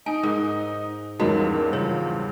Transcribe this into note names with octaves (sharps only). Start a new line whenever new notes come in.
D#4 D#5 G#5
G#2 A#4
E2 G2 G#3 A#3 C#4 D#4 F#4
A#3
C#3 F3 C#5